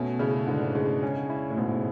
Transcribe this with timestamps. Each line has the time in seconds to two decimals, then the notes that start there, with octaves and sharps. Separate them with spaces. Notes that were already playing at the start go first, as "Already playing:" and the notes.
Already playing: B2 A3 C#4
0.19 C#3 E4
0.47 G#2 D3
0.75 C#3 G#3
1.03 C#4
1.30 E4
1.50 A2
1.57 G#2 B2